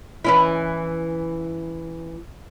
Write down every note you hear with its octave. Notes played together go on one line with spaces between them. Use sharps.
E3 C#4 E4